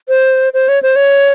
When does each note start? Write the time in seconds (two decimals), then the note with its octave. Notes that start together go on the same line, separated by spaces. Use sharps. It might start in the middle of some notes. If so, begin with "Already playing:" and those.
0.09 C5
0.54 C5
0.69 C#5
0.83 C5
0.96 C#5